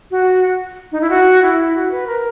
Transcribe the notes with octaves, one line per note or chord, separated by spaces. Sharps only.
F#4
D#4
E4
F#4
E4
F#4
B4
A#4